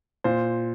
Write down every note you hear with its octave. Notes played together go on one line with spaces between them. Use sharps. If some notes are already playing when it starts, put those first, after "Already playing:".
A#2 C5